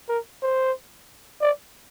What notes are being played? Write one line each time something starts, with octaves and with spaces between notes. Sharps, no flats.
A#4
C5
D5